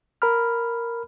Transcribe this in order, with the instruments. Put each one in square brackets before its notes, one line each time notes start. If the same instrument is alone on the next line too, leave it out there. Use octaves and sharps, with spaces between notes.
[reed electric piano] A#4 A#5 B5 F6